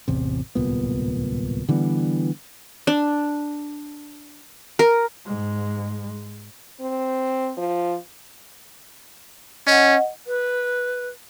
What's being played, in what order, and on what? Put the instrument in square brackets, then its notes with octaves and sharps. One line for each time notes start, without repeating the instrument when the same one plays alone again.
[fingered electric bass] A1 E2 C3
D1 C2 A#2 B3
D3 E3 G3 B3
[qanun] D4
A#4
[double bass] G#2 G#3
[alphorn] C4
F3
[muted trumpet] C#4 [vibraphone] D#5 F#5
[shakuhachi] B4